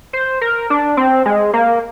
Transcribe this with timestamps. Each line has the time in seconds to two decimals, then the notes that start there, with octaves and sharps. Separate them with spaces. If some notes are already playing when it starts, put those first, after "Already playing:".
0.13 C5
0.41 A#4
0.70 D4
0.97 C4
1.26 G#3
1.53 A#3